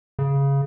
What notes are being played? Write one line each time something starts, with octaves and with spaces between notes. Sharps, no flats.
C#3